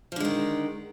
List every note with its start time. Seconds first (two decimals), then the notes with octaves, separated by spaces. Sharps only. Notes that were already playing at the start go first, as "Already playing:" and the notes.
0.12 F3
0.16 D3
0.20 G#3
0.25 D#3